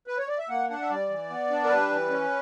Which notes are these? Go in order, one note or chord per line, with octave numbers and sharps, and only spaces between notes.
B4
C#5
D5
E5
A#3 F#5
D4 F#5
E5
G3 D5
E3
B3
D4
A#4
G3 B4
E3
C#4